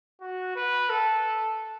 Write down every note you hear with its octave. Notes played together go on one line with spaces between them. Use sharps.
F#4
B4
A4